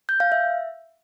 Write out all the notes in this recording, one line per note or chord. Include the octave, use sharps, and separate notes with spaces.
G6
F5
E5